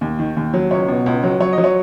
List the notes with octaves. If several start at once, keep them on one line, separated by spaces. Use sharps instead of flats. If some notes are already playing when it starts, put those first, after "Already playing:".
D#2
D#3
D#2
F#3
C#2 C#5
B2
C#2
F#3
F#3 C#5
D#5
F#3
C#5